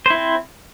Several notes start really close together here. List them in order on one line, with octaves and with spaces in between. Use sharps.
C5 E4 C4